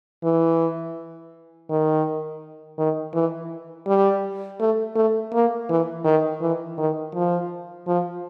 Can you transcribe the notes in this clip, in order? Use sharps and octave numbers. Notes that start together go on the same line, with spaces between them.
E3
D#3
D#3
E3
G3
A3
A3
A#3
E3
D#3
E3
D#3
F3
F3